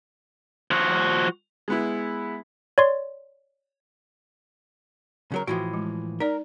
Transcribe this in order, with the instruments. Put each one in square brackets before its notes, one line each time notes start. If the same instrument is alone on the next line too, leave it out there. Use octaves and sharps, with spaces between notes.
[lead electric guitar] F3 F#4
[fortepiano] G#3 B3 E4
[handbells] C#5 D5 C6
[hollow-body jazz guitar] C#3 F#3 A#4
[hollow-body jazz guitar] A2 E3 F3 [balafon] F#4
[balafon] G#3
[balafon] D#4 D5 [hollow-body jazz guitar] A#4